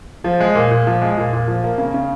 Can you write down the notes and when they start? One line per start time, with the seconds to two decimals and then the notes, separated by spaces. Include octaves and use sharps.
0.24 F3
0.40 G#3
0.55 A#2
0.71 A#2
0.87 F3
1.02 G#3
1.18 A#2
1.33 A#2
1.48 F3
1.64 A#3
1.78 C#3
1.94 C#3